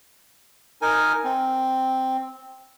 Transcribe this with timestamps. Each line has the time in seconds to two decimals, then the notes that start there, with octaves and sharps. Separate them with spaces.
0.82 D#4 A#4 G#5
1.24 C4